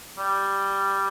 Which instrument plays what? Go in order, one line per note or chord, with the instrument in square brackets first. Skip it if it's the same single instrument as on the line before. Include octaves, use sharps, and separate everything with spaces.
[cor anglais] G3